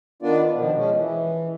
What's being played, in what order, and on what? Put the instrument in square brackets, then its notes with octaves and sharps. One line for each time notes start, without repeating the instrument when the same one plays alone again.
[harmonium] D#3 B3 D4 F4 D5
B2 D#3 F3
F3 G#3 C#4
E3